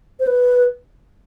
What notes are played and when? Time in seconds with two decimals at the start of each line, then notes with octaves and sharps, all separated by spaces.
0.20 C5
0.27 B4